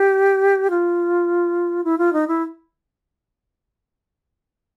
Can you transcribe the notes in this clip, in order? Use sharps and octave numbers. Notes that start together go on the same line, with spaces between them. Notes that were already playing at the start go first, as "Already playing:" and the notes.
Already playing: G4
F4
E4
F4
D#4
E4